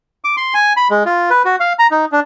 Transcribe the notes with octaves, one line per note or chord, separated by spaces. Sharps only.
D6
C6
G#5
B5
G#3
F4
B4
F#4
F5
A#5
D#4
D4